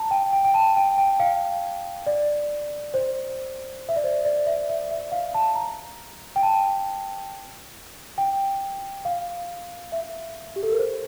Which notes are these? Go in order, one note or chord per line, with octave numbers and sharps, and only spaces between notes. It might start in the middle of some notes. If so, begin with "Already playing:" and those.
Already playing: A5 A#5
G5
G5
G5
A5
G5
G5
F5
D5
C5
E5
D5
C5
D5
E5
E5
E5
F5
A5
A#5
G5
A5
G5
F5
E5
G4
A4
A#4
C5